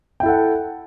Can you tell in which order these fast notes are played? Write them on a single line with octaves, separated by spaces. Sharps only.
G5 E4 A4 F#5